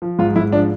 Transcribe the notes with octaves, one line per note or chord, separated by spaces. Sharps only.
F3
G#2 F4
G#2 E4
F3 D4